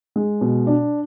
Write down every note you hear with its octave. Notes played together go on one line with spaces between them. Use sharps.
G#3
B2
D4